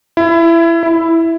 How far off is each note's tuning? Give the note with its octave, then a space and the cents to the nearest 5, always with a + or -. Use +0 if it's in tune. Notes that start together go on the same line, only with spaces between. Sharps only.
E4 +20
E4 +0